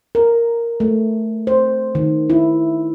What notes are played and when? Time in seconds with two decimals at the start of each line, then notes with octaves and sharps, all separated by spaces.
0.15 A#4
0.80 A3
1.47 C5
1.95 D#3
2.30 E4